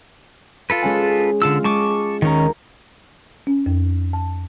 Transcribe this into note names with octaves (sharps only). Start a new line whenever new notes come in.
F4 A4 B4
G#3 C#4 G#5
D3 F4 A5 E6
G#3 A5 C#6 D6 D#7
D#2 D#3 C#4 A#5
C#4
F2
A5